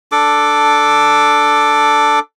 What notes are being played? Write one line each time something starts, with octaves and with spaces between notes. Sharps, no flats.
D4 A4 D6